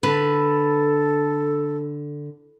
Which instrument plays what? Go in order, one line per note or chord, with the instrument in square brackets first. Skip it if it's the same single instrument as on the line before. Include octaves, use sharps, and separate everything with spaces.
[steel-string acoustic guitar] D3 [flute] A4 [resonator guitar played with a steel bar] B4